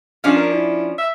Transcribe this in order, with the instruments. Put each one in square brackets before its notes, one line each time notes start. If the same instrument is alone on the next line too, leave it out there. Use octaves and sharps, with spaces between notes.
[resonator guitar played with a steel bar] F3 C#4 D4 [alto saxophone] F5
[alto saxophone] A#4
E4
E5